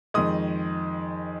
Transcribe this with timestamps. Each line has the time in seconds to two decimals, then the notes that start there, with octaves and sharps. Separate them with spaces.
0.14 F2 D#3 G#3 D#6